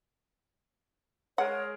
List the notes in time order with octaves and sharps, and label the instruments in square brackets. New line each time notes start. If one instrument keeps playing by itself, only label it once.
[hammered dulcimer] G#3 G#4 A#4 [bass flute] C#5 [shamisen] F#5